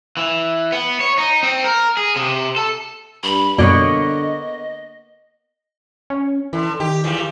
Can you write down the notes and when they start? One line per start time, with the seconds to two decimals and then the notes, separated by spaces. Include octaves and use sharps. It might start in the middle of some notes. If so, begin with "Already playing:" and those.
0.17 E3
0.72 B3
1.01 C#5
1.18 D#4
1.43 C4
1.64 A#4
1.97 G#4
2.16 C3
2.56 A4
3.24 G2 B5
3.58 F#2 B2 D3 G3 A#3 B3 C#5 D#5
6.10 C#4
6.53 D3 E3
6.80 D#3 G4
7.04 E2 A#2 G3